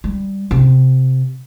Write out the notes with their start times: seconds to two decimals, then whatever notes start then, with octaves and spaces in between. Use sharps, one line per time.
0.04 G3
0.51 C3